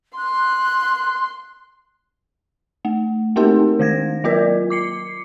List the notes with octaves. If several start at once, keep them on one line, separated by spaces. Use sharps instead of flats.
C6 F#6
A3
A3 A#3 C4 D#4 G4 A#4
D#3 G#3 G#6 A#6
F#3 A#3 F4 A#4 D5
D6 C7 C#7